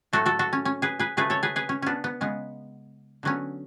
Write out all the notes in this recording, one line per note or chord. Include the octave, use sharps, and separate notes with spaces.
A2 F#3 A3 F#4 A4
F#4 A4
F#4 A4
C#4
C#4
G#4 B4
G#4 B4
C#3 F#3 A3 G#4 B4
A4 C#5
G#4 B4
G#4 B4
C#4
B3 C#4 D4
B3
C#3 G#3 B3
D3 F#3 B3 C#4